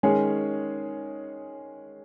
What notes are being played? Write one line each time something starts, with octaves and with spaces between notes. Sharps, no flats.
D#3 G#3 C#4 G#4 C#5